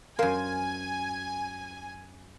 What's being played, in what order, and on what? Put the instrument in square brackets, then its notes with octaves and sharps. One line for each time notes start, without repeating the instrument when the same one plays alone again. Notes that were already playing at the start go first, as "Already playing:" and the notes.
[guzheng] F#2 C5 [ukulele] A#4 F5 [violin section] G#5